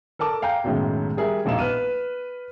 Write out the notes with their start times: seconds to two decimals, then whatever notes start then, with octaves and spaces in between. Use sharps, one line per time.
0.19 A4 A#4 A5 D6
0.42 F5 G5 G#5 A#5 G6
0.64 B1 F#2 A2 D#3 G#3
1.17 G3 G#4 A#4 E5
1.45 E1 A#1 A#3 D#4 E7
1.59 B4 F6 D#7